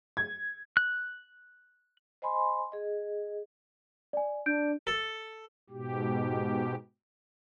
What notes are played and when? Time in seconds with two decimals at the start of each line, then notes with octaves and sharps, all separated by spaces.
0.17 G#6
0.77 F#6
2.22 C5 D#5 G#5 B5 C6
2.72 G#4 D#5
4.13 D5 G#5
4.46 D4 G6 D7
4.87 A4
5.70 G#2 B2 G4